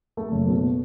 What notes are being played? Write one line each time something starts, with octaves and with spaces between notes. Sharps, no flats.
A3
F#1
B2